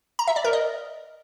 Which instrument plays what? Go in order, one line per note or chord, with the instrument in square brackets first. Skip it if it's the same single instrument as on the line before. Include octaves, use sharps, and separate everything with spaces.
[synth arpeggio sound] A#5
E5
D5
A#4
D#5